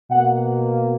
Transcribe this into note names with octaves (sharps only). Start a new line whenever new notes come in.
B2 A#3 F#5